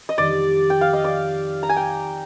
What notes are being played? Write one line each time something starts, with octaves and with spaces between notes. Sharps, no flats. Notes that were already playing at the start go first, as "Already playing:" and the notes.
D#5
F2 D#3 G3 D5
G5
F5
D#5
D5
A#5
G#5
G5